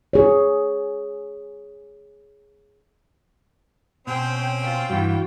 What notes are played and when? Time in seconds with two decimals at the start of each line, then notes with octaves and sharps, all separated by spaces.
0.13 G#4 C#5
4.07 B2 C4 C#4 C5 C#5 G5
4.57 F4 G5
4.90 G2 E3 F#4